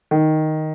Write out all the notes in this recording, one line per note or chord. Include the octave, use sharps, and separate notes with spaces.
D#3